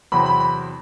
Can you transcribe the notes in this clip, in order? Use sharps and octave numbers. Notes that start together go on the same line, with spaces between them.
E2 C3 F#3 C4 B5
B5
B5